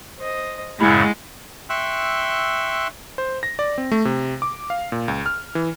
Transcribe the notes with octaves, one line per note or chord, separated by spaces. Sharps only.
C5 D#5
F#2 A2 C#3 G#3 E4 F#5 G#5 B5
E5 G5 C6 C#6 E6 F#6
C5
A#6
D5
C4
A3
C3
D6
F5
A#2
C#2
F6
E3